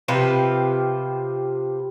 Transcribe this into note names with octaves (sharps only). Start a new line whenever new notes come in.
C3 F3 G4 B4